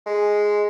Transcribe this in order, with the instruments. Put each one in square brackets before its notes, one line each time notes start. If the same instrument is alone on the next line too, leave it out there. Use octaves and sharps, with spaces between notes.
[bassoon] G#3